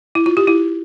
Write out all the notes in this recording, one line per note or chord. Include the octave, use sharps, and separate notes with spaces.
E4
F4
G4
E4